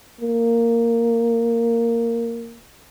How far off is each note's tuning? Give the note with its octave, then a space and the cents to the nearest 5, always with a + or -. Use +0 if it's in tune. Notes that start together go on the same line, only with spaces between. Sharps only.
A#3 -10